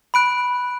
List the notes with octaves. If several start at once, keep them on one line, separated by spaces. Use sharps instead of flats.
B5 F#6 D7